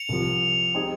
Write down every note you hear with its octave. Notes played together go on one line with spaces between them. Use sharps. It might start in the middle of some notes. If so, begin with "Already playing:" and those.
Already playing: C#7 F7
C2 C3 F3
G3 C4 D#4 G#4